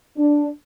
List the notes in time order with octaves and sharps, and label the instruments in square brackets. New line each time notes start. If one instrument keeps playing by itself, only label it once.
[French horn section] D4